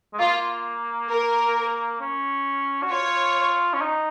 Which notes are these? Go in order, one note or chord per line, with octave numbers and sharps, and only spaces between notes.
G#3
A#3 F4
A#4
C#4
F#4
F4 C#5
C#4
D#4